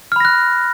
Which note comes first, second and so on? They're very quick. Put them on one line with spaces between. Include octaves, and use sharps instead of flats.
F6 B5 A#6 F#6